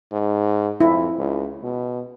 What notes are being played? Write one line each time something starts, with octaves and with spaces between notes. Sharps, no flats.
G#2
F2 E4
C#2
B2